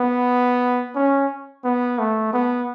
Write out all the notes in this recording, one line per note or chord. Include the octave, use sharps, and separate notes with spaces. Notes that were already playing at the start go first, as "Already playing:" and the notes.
Already playing: B3
C#4
B3
A3
B3